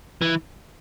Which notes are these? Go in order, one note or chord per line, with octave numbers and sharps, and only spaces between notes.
E3